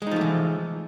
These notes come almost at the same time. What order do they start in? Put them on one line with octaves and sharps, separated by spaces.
G#3 D#4 F3 A3 E3